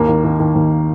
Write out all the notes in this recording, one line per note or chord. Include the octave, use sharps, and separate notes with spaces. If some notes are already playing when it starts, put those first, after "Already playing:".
Already playing: D#2 A#3
D#3
D#3
D#3
D#2